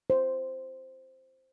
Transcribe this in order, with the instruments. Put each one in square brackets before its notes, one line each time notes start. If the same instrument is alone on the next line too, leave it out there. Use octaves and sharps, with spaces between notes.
[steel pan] C5